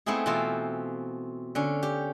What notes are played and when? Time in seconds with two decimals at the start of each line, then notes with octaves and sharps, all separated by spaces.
0.06 A3 B3 C4 D#4 E4 G#4
0.26 B2 E3 C4 F4 A4 C5
1.55 D3 C#4
1.83 G4